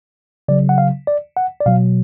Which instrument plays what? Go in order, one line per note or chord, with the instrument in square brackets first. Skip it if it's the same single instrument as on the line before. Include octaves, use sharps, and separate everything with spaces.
[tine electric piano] C#3 F#3 D5
F#5
F5
D5
F#5
D5
B2 F#3 F5